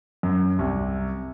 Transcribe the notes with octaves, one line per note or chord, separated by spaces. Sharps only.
F#2
C2